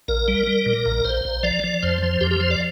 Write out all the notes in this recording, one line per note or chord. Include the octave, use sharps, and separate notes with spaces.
A#1 A#4
G3
G3
A#2
A#1
A#1 C5
A#1
F3 D5
F3
F2 C5
F3
F2 G4
G4
F3 C5
D5